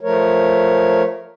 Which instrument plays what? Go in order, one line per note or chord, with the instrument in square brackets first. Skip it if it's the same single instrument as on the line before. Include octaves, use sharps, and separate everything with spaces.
[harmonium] F3 A3 A#4 C#5